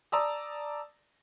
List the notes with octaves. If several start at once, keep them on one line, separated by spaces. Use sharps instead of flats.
D5 A5 A#5 D#6 E6